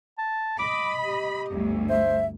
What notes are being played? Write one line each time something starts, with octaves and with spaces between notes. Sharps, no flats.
A5
D#5 B5 D6
G4
G1 D2
C5 E5